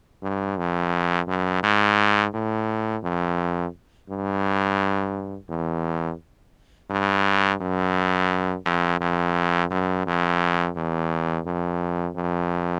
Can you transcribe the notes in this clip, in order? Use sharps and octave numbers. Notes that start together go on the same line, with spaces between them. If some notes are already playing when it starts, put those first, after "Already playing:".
G2
F2
F#2
G#2
A2
F2
G2
E2
G2
F#2
F2
F2
F#2
F2
E2
F2
F2